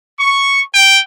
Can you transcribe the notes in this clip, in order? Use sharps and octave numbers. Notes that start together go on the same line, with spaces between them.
C#6
G5